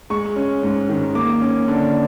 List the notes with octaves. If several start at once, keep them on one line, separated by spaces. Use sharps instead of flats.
G#3 C#6
C#4
G#2
D#3
A#3 D6
C#4
D3